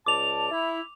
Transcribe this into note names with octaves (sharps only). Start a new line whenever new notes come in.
C#2 D5 A5 D6 F7
E4